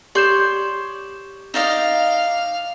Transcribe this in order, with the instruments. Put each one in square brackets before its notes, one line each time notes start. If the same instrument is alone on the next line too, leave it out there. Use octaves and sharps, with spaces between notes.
[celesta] G4 G6 E7 [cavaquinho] C#5 D5 C6
[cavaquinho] D#4 D5 D#5 [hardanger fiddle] F5